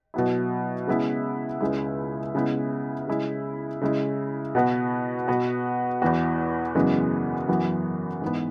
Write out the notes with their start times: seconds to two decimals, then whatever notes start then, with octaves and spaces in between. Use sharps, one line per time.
0.14 B2 F#3 B3 E4
0.87 C#3 G#3 B3 E4
1.61 C#2 C#3 G#3 E4
2.35 C#3 G#3 B3 E4
3.08 C#3 G#3 E4
3.81 C#3 G#3 E4
4.55 B2 B3 F#4
5.28 B2 B3 F#4
6.02 E2 E3 B3 F#4
6.75 F#2 C#3 E3 G#3 B3
7.48 F#2 E3 B3 F#4
8.22 G#2 E3 B3